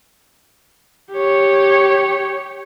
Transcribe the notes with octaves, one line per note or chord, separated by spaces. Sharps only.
G4 C#5